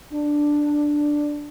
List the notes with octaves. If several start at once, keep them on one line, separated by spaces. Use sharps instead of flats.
D4